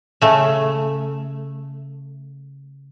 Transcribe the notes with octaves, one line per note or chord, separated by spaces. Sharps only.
C#3 A3